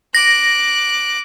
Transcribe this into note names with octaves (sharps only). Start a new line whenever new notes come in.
D6 F#6 A#6